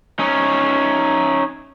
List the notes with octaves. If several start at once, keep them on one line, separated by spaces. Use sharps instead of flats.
C#4 D#4